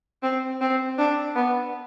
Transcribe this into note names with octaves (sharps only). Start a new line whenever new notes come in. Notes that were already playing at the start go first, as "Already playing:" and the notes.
C4
C4
D4
B3